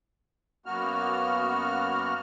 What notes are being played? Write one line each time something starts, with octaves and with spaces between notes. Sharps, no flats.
F#2 A#3 B3 F#4 F6